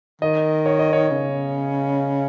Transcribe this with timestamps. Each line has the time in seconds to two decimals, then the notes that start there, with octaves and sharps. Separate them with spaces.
0.22 D#3 D#5
0.66 C#5
0.79 D#5
0.93 C#5
1.11 C#3